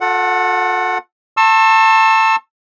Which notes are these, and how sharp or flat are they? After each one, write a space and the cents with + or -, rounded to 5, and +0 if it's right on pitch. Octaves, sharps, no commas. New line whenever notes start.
F4 +40 A4 +0 F#5 +0
A5 +25 C#6 -45 E6 +0